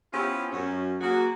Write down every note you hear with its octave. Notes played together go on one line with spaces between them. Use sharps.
B3 C#4 E4 F4 G4 C5
F#2 C#4
A#3 F#4 G#4